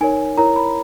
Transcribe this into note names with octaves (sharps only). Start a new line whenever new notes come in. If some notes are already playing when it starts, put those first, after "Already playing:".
D#4 A#4 C#5 G#5
E4 A#4 C#5 A#5
B5